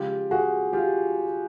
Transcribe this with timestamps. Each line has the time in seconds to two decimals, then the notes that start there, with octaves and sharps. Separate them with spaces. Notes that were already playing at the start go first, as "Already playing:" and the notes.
Already playing: C#3 F3 G#3 F4 G4
0.31 F#4 G#4
0.73 F4 G4